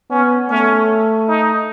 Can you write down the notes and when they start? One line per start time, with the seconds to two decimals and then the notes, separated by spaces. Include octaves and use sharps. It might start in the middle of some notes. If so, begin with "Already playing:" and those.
0.10 B3 C#4
0.49 A3 C#4
1.28 D#4